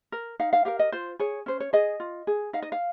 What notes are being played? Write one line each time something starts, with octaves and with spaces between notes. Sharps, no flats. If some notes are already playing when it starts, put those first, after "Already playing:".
A#4
D#4 F5
F5
G4 A#4 F5
D#5
F4 C5
G#4 C#5
C#4 C5
C#5
G#4 D#5
F4
G#4
D#4 F5
D#5
F5